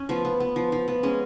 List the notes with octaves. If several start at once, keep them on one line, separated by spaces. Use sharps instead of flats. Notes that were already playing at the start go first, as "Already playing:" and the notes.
Already playing: C#4
F3 B3
B3
B3
F3
F3
B3
G#3 C#4